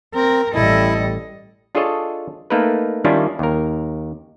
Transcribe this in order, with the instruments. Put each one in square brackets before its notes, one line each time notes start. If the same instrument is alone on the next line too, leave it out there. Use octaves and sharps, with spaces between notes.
[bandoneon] C4 [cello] A#4
[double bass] A1 G3 [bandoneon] E4 [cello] A4 D#5
[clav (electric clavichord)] D4 F4 G#4 A4 C#5 D#5
A3 A#3 D#4 A#4 B4
D#3 G3 C#4 D4 E4 F4
D#2 A#4